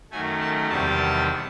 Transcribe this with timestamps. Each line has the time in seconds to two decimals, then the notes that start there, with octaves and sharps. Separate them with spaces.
0.11 F#2 D#3 F#3 A3 G#5
0.41 A5
0.70 E2 C3 D#3 G3 A5